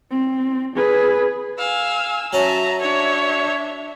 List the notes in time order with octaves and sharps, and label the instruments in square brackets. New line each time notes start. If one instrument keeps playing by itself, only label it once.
[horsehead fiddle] C4
G#4 B4
[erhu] F5 [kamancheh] G#5 E6
[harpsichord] F#3 C#4 [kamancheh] E5 A5 [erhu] A#5
[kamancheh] D4 E5 [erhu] C#5